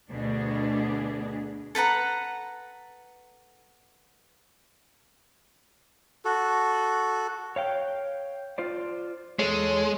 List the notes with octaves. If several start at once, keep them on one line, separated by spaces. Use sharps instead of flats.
D2 B2 D4 G#4
A4 B4 F#5 A#5
F#4 A4
C#5 F5 G5
F4 C5 D5
E2 G#3 A4 C#5